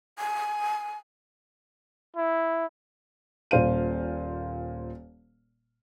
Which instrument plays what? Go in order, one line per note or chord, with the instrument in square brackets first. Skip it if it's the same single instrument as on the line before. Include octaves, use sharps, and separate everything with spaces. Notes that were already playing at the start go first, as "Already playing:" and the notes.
[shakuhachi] G#5
[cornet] E4
[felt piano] D#1 A#2 C5 F5 D#7